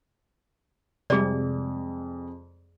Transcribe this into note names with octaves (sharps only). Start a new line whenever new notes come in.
F2 C3 G3 G#3 G#4 D5